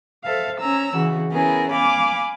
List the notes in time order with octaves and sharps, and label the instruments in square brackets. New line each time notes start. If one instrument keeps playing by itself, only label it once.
[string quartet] A4 C5 E5 F5
C#4 A#5 E6
C#3 E3 F#4
B3 C#4 E4 G#4 A#4 B4
F5 G#5 B5 D6